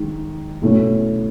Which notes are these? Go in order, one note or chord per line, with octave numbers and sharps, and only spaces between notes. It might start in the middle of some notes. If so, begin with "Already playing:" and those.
Already playing: D#3 G#3
B2 A3 C#4 E4